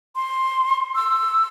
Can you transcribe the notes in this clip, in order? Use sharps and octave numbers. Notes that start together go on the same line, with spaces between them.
C6
E6